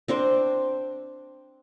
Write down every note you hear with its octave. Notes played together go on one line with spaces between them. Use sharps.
C4 D4 C5